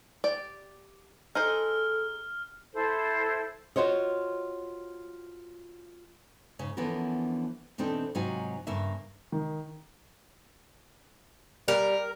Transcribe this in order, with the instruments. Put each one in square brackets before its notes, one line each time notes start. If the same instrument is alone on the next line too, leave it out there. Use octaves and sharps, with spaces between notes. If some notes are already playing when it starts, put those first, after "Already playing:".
[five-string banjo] G4 D5
[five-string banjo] D#4 G#4 C5 [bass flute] A4 [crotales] F6
[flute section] E4 A4 C5
[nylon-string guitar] F4 F#4 C5 C#5 D#5
G#2 C#3 C#4
D3 E3 F3 B3 C#4 A#4
B2 E3 C4 D4 D#4 A4
G#2 C3 F#3 D#4 F4 G#5
G2 C#3 A#3 E5
[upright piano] D#3
[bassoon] G3 [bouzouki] A#4